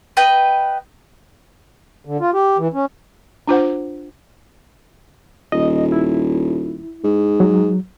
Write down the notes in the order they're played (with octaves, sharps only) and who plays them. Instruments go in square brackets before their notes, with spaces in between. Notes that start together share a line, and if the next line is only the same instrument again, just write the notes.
[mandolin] B4 D#5 G5
[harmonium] D3
F4
G4
E3
C#4
[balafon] D4 F4 C5 F#5
[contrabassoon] D#1 [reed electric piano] D#5
[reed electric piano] E4
[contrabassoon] G#2
[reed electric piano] F#3